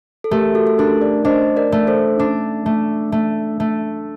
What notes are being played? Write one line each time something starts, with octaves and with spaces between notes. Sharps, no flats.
A4
A3 G4 A#4
F#4 A4
A4
D4 G4 A#4
A#4 D5
D4 C5 D#5
A#4 D5
A3
A4 C5
D4
A3
A3
A3